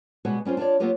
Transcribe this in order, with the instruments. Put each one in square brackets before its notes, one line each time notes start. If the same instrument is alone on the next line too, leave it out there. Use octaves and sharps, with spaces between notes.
[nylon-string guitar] B2 G3 G#3 B3 F#4
G3 C#4 F4 C5
D4 F4 F#4 C#5 D5
F#3 A#3 B3 F4 G4